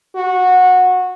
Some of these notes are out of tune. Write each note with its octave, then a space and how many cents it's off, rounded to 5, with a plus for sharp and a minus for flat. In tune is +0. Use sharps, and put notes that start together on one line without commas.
F#4 -15